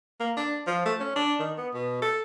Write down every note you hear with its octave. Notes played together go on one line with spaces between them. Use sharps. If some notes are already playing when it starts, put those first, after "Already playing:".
A#3
D4
F3
A3
C#4
D4
D#3
B3
B2
A4